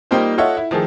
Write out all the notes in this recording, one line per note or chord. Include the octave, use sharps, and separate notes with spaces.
G3 A#3 D#4 F4 G4 C5
F4 A4 C#5 D#5 E5 F#5
E4
D#3 F3 A3 G#4 A4